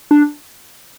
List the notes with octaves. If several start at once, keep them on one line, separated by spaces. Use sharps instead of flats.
D4